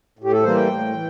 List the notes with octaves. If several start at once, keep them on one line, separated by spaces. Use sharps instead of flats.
A2
G4
A4
E3 G3 A#3 C5
G5
A2
E3